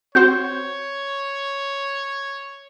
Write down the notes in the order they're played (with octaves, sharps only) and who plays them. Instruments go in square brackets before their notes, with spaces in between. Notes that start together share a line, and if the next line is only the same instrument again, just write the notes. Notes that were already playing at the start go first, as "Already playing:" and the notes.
[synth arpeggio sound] C4 F#4 C5 [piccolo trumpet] C#5 [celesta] G6